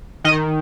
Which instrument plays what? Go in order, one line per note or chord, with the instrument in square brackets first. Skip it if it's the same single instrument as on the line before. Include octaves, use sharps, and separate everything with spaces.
[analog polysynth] D#3 D#5